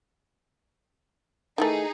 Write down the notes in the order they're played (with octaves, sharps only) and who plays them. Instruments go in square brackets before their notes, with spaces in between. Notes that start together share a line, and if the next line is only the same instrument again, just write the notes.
[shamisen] D#3 E3 A3 [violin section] D#4 G#4